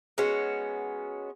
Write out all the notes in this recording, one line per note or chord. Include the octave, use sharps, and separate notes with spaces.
G#3 B3 C#4 F#4